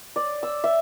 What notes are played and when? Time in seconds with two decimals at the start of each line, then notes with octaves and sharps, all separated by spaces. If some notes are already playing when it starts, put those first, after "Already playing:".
0.16 D5
0.43 E6
0.64 E5